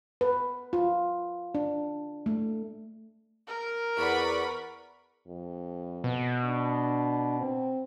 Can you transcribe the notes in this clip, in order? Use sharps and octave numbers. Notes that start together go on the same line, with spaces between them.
B4
F4
D4
A3
A#4
E2 B4 D5 F#5 B5 C#6
F2
B2
D4
C4